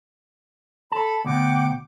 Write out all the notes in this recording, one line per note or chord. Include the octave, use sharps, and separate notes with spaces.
A4 A5 B5
D2 B2 F#5 G5 D6